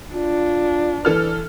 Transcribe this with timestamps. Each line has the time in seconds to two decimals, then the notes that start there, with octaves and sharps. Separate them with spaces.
0.14 D4 F4
1.05 E3 A4 B4 F6